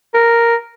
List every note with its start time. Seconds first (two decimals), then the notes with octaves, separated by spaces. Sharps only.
0.14 A#4